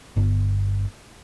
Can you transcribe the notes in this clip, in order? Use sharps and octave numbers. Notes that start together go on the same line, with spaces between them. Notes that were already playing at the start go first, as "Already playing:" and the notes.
G1